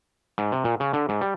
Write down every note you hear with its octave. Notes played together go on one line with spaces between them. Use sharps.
G#2
C3
A#2
C#3
D3
G#2
G3